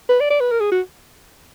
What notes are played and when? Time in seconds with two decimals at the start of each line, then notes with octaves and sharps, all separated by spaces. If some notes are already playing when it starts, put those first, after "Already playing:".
0.09 B4
0.20 D5
0.30 D5
0.40 B4
0.51 A#4
0.60 G#4
0.72 F#4